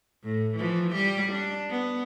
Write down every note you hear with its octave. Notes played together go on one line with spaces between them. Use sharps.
A2
E3 F3
G3 G4
D4
B3